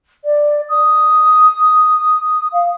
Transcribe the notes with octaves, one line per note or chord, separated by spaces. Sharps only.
D5
D#6
F5